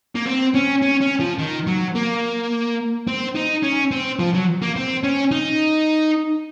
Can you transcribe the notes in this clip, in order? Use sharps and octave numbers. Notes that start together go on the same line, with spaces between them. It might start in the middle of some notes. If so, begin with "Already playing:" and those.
A#3
C4
C#4
C#4
C#4
F3
D#3
F#3
A#3
C4
D#4
C#4
C4
F3
F#3
A#3
C4
C#4
D#4